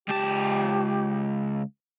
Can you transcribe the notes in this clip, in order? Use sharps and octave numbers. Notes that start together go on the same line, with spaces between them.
C#2 G4 A5